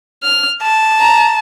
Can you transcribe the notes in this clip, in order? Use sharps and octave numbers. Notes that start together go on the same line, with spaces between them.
F6
A5
A#5